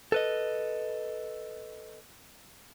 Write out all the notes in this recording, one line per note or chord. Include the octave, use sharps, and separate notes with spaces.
A4 B4 D#5